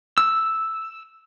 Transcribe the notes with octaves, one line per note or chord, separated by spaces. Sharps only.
E6